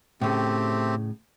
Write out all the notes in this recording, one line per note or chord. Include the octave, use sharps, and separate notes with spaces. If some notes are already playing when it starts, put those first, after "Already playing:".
A2 C#3 A3 C4 G4